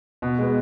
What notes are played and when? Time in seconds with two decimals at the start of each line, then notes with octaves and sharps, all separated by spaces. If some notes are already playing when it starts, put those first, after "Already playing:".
0.22 B2
0.39 G#3 B3